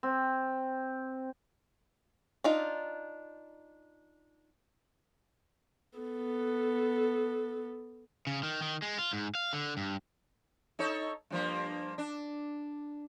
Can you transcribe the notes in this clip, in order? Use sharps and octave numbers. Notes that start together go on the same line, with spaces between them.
C4
D4 D#4 F4
B3 A4
C#3
D#3
D#3
G#3
F4
G#2
F5
D3
G2
D#4 A4 C#5
G2 F3 A#3
D4